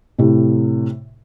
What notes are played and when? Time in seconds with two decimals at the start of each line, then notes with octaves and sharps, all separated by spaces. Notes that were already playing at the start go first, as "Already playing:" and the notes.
0.18 A2 C3